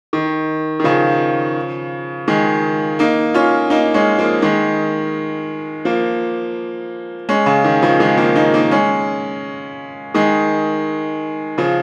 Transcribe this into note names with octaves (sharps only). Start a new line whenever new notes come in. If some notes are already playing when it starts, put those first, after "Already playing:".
D#3
D#3
C#3 F3
D#3 G#3
A#3 D#4
C#4 F4
A#3 D#4
G#3 C#4
F3 A#3
D#3 G#3
F3 A#3
G#3 C#4
C#3
D#3
C#3 F3
D#3 G#3
F3 A#3
A#3 D#4
A#3 D#4
G#3 C#4
D#3 G#3
C#3 F3